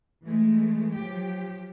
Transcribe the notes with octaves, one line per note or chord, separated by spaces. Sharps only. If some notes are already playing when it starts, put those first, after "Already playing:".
E3 G#3 A3
F3 F#3 G4